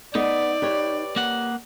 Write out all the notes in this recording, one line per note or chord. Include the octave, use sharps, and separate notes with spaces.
B3 D#4 D5 D#5
G4 B4 C#5
A#3 F#5